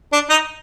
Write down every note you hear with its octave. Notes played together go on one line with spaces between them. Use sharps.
D4
D#4